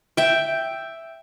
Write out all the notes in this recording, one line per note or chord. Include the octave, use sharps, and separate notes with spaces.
E5 G5